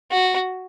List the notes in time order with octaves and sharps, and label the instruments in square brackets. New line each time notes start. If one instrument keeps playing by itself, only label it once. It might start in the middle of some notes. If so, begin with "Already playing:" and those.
[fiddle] F#4